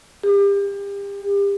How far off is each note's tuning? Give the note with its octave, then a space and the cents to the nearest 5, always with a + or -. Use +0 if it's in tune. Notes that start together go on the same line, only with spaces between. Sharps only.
G4 +35